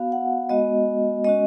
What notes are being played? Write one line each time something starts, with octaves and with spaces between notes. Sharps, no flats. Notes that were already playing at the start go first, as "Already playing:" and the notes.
Already playing: B3 F#4 F5
F#5
G#3 B3 F#4 D#5
G#3 C#4 F#4 D#5